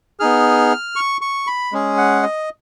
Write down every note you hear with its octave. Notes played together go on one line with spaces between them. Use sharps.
B3 D#4 G#4 F6
C#6
C#6
B5
G#3 C#4 G#4
F#5
D#5